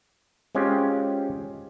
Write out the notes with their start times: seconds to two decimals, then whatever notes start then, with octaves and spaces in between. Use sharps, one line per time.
0.55 G#3 C4 C#4 F4 G4